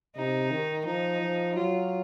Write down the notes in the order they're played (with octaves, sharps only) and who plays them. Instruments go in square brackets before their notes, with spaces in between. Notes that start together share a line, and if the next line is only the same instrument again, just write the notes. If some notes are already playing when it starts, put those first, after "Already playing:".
[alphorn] C3 [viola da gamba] D#4
[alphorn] D#3
[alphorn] F3 [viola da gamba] D#4
[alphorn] F3
[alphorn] F#3 [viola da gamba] F4